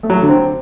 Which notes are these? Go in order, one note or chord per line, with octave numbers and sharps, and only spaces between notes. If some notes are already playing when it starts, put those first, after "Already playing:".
A3
F#3
A3
D3
C4